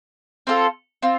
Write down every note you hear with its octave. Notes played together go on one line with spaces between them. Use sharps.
C4 F4 A4
C4 F4